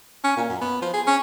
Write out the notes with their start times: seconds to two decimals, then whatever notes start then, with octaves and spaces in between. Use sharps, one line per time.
0.24 C#4
0.37 A#2
0.49 F#2
0.61 B3
0.82 F3
0.94 G#4
1.07 C#4